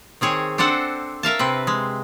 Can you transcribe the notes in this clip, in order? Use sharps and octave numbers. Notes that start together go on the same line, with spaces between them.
D#3 C4 G#4 C#5
C4 D4 A4 C5 F#5
A#4 E5 F5 A5
C3 C4 B4
G#3